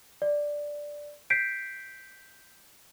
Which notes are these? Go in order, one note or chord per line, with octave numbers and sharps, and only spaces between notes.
D5
G6 B6 C7 D7